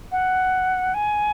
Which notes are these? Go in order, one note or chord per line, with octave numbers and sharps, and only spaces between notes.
F#5
G#5